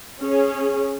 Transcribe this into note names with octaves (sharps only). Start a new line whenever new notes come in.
C#4 G#4